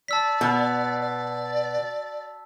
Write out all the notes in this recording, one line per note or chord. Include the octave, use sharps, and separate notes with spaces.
D5 A5 E6 B6
B2
D5